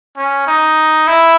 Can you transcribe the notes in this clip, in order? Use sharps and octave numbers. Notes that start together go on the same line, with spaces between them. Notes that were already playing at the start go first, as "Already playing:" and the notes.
C#4
D#4
E4